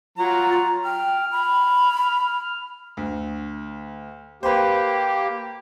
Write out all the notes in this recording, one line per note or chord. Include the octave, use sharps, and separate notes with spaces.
F#3 F4 A#5
G5 F6
B5
D2
A#3 G4 B4 C5